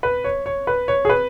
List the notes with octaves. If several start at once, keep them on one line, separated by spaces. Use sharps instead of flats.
B4
C#5
C#5
B4
C#5
G#4
B4